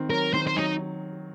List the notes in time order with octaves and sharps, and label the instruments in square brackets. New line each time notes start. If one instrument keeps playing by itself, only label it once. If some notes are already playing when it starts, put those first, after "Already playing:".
Already playing: [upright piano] D#3 C4
[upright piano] F#3 [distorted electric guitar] A#4
[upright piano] D#3 [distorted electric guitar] C5
[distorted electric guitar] C5
[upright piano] F#3 [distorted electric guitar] D#4